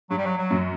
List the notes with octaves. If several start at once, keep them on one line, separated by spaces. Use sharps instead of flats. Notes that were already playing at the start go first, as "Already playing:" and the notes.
G2 F#3
G3
F#3
F#3
F#2